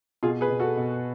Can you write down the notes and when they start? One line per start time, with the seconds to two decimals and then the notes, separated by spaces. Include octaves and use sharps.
0.23 B2 F4 G#4
0.41 G#4 B4
0.50 B2
0.59 F#4 A4
0.77 B2